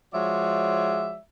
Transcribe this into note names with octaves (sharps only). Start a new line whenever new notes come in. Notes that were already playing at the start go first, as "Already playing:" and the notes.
F3 G#3 F#4 C#5 D5 E5